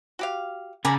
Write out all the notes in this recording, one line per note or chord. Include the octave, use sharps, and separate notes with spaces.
F#4 G4 F5
C#3 D5 G#5 A#5 B5